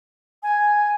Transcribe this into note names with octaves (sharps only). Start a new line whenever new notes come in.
G#5